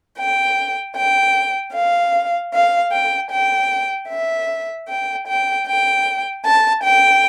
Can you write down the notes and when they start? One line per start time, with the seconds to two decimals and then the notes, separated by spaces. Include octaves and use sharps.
0.17 G5
0.95 G5
1.74 F5
2.53 F5
2.92 G5
3.31 G5
4.09 E5
4.87 G5
5.27 G5
5.66 G5
6.44 A5
6.83 G5